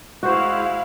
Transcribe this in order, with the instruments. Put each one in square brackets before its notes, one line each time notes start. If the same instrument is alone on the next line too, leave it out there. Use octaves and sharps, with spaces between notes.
[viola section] G#3 E4 F5 [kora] F#4 C5